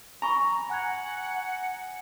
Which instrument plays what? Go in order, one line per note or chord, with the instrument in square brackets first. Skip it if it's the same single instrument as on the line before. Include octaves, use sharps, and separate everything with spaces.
[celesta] G#5 [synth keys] A#5 [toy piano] B5 C#6
[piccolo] F#5 [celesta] G#5 F#6 G#6